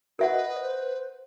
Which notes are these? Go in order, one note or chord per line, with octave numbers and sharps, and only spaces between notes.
F#4 A#4 B4 E5 F#5
D#5
C5